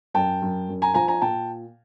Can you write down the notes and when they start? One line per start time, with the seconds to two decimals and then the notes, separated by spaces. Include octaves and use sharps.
0.14 F#2 G5 A5
0.42 F#2
0.69 F#2
0.82 G#5 A#5
0.94 F3 G#5 A#5
1.08 G#5 A#5
1.21 A#2 G5 A5